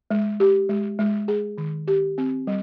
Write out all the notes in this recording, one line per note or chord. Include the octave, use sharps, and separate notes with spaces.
G#3
G4
G#3
G#3
G#4
D#3
G4
C4
G3